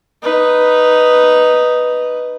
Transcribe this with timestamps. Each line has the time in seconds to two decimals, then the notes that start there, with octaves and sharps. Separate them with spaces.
0.23 D#4 B4